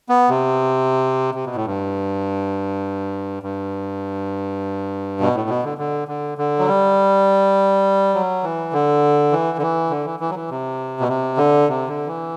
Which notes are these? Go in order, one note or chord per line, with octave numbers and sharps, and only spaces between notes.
B3
C3
C3
B2
A2
G2
G2
B2
A2
B2
D3
D3
D3
D3
F#3
G3
F#3
E3
D3
E3
D3
E3
D3
E3
E3
F#3
E3
C3
B2
C3
D3
C3
D3
E3